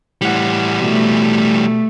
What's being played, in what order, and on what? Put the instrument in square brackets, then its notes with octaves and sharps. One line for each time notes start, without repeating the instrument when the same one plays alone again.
[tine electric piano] A2 F#5 [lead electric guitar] E3 G3
[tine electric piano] B2 [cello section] A3